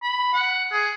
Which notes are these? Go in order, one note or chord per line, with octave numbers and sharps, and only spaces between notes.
B5
F#5
G#4